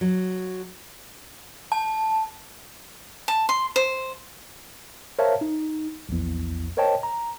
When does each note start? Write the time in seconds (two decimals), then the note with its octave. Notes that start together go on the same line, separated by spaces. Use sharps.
0.01 F#3
1.72 A5
3.28 A5
3.49 C6
3.76 C5
5.19 A#4 C5 C#5 E5 F5 A5
5.41 D#4
6.09 A#1 E2
6.77 A#4 C5 C#5 D#5 G5 A5
7.03 A#5